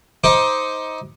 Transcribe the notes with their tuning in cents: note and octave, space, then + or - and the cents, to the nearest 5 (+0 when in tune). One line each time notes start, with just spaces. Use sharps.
D#4 +20 C5 +0 D6 +15